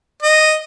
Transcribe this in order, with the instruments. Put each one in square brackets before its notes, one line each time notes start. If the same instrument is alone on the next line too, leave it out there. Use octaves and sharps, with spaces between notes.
[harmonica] D#5